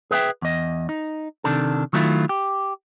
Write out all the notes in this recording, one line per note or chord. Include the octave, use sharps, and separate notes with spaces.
G#4 B4 E5 F#5 G5
E2 D#5
D#4
C3 D#3 D4 A4
D#3 F#3 A3 C#4 E4 F4
G4